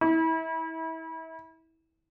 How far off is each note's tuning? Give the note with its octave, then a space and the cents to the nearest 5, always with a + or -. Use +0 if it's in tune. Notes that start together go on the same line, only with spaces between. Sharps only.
E4 -30